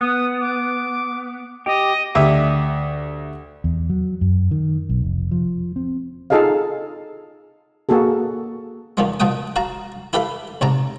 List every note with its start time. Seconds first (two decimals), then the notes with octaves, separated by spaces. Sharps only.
0.01 B3 D#6
0.41 D6
1.66 G4 D#5 G5
2.15 D2 G4 E5 D6
3.64 E2
3.90 F#3
4.21 F#2
4.51 D#3
4.89 B1
5.02 F1
5.31 F3
5.76 C4
6.30 D#4 F4 G#4 A4 D#5 F5
7.89 A#3 F#4 G#4 A4
8.97 E2 D#3 F3 G#3
9.20 B2 F3 F#5 G5 D#6
9.56 F#4 F5 A5 A#5
10.13 E4 G4 A4 B4 F5 B5
10.61 B1 G#2 C3 A5 A#5